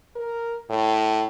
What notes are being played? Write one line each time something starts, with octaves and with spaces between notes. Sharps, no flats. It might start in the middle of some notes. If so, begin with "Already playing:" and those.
A#4
A2